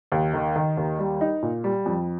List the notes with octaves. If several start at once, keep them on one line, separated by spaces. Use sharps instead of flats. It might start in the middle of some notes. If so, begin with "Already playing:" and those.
D#2
D#3
D#3
D#2
G3
D#4
A#2
G3
F2